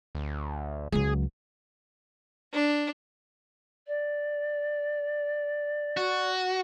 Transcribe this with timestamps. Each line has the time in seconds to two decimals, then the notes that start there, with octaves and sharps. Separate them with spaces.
0.15 D2
0.92 C#2 F#3 G#4
2.53 D4
3.87 D5
5.97 F#4